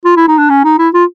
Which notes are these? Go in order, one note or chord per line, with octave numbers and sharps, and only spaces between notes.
F4
E4
D#4
D4
C#4
D#4
E4
F4